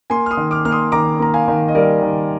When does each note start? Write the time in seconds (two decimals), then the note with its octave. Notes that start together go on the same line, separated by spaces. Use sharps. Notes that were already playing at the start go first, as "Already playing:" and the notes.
0.10 A#3 G#5 C6
0.26 F6
0.31 C6 D#6
0.37 D#3
0.51 D6 F6
0.65 A#3 F6
0.72 C6 D#6
0.92 D#3 A#5 D6
1.19 A#3 A#5
1.34 F5 G#5
1.48 D#3
1.68 D#5
1.75 G3 A#4 D5
2.02 D#3